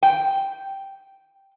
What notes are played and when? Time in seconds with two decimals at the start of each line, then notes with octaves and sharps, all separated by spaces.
0.03 G5